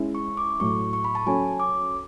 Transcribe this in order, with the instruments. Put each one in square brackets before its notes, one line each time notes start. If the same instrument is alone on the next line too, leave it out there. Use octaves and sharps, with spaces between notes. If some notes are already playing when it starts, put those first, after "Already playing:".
Already playing: [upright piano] G#3 C#4 E4
[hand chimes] C#6
D6
[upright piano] A2 F#3 A3 [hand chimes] C#6
[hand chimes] C#6
B5
A5
[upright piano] F#3 C#4 F#4 A4 C#5 [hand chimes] G#5
[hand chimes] D6